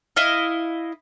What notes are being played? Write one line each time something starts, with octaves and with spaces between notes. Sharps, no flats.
E4 D#5 F5